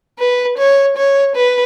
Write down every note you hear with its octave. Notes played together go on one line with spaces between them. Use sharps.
B4
C#5
C#5
B4